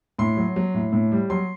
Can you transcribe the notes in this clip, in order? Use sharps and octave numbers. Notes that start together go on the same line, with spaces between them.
A2 C6
F#3
F#3
A2
A2
G3
F#3 C6